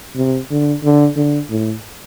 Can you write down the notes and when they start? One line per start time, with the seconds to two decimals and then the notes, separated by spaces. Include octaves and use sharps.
0.16 C3
0.51 D3
0.83 D3
1.16 D3
1.50 A2